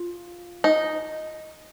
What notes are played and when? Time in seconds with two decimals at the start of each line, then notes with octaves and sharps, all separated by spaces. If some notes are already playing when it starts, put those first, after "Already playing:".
Already playing: F4
0.64 D#4